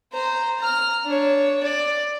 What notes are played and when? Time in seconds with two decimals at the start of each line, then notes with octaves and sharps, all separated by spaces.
0.13 C5 A#5
0.59 A#5 F6
1.05 D4 C#5
1.63 D5